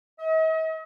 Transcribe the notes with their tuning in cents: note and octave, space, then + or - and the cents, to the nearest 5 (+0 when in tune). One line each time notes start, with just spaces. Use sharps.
D#5 +45